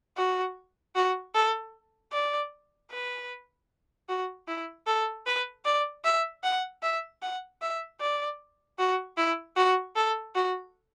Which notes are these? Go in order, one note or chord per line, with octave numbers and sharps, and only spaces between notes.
F#4
F#4
A4
D5
B4
F#4
E4
A4
B4
D5
E5
F#5
E5
F#5
E5
D5
F#4
E4
F#4
A4
F#4